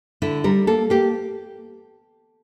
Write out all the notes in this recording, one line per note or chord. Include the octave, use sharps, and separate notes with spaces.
D3 E4
G3 A#4
A#3 A4
A#3 G4